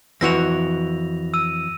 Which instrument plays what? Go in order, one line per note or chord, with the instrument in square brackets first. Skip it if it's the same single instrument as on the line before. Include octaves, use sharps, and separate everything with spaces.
[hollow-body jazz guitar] F2 E3 F#4 [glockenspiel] A#6 F7
[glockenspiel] E6 D#7